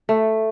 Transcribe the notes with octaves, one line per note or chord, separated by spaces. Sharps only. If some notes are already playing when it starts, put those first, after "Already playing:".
A3